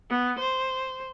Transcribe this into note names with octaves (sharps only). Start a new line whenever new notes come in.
B3
C5